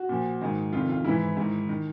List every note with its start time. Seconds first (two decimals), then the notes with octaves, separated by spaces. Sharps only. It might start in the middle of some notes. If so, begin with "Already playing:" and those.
Already playing: F#4
0.09 A#2 F3
0.41 G#2 D#3
0.72 F2 C3 D#3 F4
0.89 F4
1.05 G#2 E3 E4
1.37 G#2 D#3
1.69 D#3